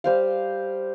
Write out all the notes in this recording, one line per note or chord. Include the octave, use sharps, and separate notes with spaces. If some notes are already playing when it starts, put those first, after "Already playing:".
G3 C5 F5